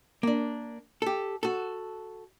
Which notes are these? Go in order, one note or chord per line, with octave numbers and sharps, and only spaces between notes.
A#3 D4
G4 A4
F#4 A4